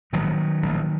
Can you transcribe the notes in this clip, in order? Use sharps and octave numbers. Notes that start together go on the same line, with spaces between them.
A#1 A2 D#3 F#3
A#1 A2